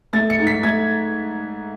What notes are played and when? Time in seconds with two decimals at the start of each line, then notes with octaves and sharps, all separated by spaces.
0.13 A3 A6
0.30 C#7
0.39 G#2
0.47 B6
0.63 A3 G#6